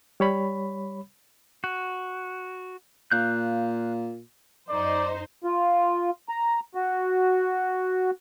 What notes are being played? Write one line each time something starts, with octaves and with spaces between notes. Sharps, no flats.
G3 C#5 B5
F#4
A#2 F5 F#6 G6
F#2 D#4 C5 D5
F4
A#5
F#4